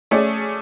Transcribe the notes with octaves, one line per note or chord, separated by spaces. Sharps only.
A3 C#4 G#4 D5